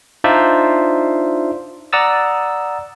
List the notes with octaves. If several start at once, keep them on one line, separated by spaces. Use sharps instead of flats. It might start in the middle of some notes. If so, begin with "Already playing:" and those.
D4 D#4 F4 C5 D5 E5
D5 F#5 A#5 D#6 E6 A6